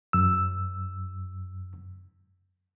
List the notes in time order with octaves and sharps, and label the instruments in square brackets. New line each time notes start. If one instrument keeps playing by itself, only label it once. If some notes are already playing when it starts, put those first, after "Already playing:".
[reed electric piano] F#2 E6